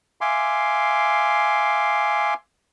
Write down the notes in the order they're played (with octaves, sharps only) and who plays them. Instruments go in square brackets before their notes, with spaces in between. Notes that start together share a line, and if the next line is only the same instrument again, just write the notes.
[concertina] E5 F5 G#5 C6 D6